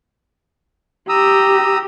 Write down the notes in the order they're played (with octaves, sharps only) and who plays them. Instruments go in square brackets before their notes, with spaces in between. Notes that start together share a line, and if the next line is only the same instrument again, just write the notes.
[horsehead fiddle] G4 [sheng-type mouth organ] A#5 D#6 E6